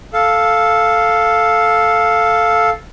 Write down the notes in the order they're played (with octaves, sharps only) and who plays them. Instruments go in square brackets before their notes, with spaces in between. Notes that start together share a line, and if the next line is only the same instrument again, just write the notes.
[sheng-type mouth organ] A4 F5